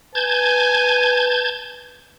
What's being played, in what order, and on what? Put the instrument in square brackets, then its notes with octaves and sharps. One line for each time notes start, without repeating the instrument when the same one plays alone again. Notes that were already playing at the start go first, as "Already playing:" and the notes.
[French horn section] B4 [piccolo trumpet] G#5 [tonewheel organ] A5 G6 G#6